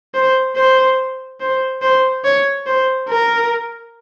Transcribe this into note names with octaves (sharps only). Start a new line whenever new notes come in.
C5
C5
C5
C5
C#5
C5
A#4